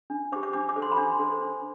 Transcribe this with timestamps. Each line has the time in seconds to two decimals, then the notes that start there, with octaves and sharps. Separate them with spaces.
0.10 D4
0.32 C5 D6
0.36 G4
0.43 D6
0.53 D4 D6
0.69 D6
0.76 A4 C5
0.82 C6
0.91 B5
0.97 D4 C6
1.19 A4 C5
1.41 D4